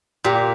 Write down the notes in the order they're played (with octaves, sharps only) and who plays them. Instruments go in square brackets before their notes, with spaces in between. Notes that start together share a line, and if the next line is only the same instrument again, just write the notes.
[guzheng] A#2 [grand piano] G4